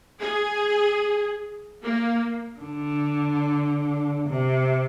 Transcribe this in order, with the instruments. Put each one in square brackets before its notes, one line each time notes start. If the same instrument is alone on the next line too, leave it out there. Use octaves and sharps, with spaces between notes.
[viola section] G#4
A#3
[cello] D3
C3